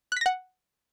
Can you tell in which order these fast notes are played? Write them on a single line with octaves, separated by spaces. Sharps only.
F#6 B6 A#6 F#5